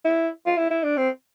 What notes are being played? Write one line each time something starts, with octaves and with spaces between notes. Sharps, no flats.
E4
F4
E4
E4
D4
C4